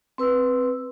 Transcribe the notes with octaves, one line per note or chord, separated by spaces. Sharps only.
C4 B4 E6